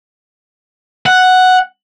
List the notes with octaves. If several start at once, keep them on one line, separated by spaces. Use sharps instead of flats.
F#5